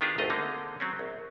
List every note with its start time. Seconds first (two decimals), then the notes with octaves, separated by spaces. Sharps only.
0.01 D#3 B3 D4 F4 G4 G#4
0.18 G#1 D2 A3 F4 D#5 A#5
0.30 D3 G#3 A#3 C4 D#4
0.80 F#3 C4 C#4
0.99 A#1